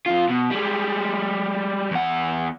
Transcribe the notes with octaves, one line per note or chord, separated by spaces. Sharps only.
F2 F4
B2
G3 G#3
E2 F#5